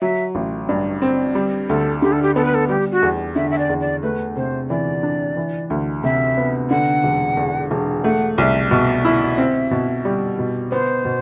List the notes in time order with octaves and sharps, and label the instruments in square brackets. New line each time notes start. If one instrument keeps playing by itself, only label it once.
[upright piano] F#3 [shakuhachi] E5
[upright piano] A1
G2
C4
G3
[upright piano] D2 [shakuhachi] A4
[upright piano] D3 [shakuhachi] G4
[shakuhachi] A4
G4
[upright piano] B3 [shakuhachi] A4
[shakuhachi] B4
A4
[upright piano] G3 [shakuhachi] G4
[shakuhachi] F#4
[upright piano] E2
[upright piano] D3 [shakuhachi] E5
[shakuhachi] E5
D5
[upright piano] E2
[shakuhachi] D5
[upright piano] A3 [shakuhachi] B4
[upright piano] C3 [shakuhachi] C5
[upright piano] E3 [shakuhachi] D5
[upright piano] D4
E3
D2
[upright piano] C3 [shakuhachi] E5
[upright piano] B3
[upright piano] D3 [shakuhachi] F#5
[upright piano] E1
E2
E1
[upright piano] A3 [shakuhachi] F#5
[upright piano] C2 [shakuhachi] E5
[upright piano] B2 [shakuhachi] E5
[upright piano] E4
C4
B2
G3
B2
[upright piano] B3 [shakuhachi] C5
[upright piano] B2